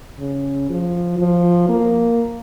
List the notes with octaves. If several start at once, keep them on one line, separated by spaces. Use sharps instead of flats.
C#3
F3
F3
A#3